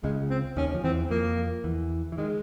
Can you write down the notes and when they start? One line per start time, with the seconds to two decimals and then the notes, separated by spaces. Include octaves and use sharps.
0.03 C#2 C#3 G#3
0.30 C4
0.57 D#2 D#3 C#4
0.75 F3
0.84 E2 E3 C4
1.10 F2 F3 A#3
1.64 E2 E3
2.12 E3
2.18 D#3 G#3